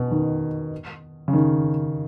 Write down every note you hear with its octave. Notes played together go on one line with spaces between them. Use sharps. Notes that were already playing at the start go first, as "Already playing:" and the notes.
Already playing: B2
D#3
C#3
D#3